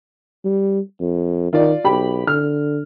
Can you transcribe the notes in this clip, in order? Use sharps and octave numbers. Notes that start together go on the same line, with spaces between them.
G3
F2
D#3 F4 D5
B1 G4 B5
D3 F6